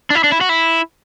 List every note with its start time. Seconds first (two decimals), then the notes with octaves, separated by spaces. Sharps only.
0.10 D4
0.15 E4
0.24 D4
0.32 E4
0.41 F#4
0.49 E4